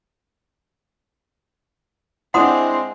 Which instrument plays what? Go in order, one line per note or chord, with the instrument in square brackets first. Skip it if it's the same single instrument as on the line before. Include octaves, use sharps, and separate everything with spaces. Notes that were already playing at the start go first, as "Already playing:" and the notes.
[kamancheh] G#3 C4 [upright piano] D4 E4 C5 [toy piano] F#5 C6 D#6